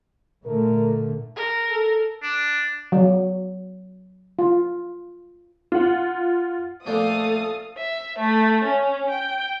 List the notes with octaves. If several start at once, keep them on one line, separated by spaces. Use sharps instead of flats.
A#2 D3 A3 A#4
A#4
A4
D4
F#3
F4
F4 F#5
A#2 F3 A3 D4 A4 F5 D#6
E5
A3
C#4
G5